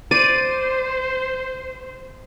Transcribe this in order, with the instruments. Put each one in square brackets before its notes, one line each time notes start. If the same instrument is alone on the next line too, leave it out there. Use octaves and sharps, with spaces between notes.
[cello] C5 [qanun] D5 [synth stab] D#7